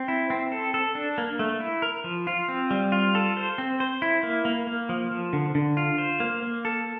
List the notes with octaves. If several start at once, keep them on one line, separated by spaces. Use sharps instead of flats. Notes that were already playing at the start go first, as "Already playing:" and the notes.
Already playing: C4
E4
C4
A4
A4
D4
A#3
A3
E4
A#4
F3
F4
C4
G3
F4
A4
C5
C4
C5
E4
A#3
A#3
A#3
F3
F3
D3
D3
F4
C5
A#3
A#3
A4